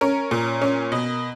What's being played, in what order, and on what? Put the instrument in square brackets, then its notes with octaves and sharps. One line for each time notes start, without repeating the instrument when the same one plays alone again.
[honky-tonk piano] C#4 A#4
A#2
C#4
B2